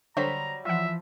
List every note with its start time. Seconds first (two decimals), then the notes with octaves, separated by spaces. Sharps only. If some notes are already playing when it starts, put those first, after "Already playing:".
0.17 D3 F#3 G3 C5 A#5 B6
0.65 E3 F3 F4 E5 F#5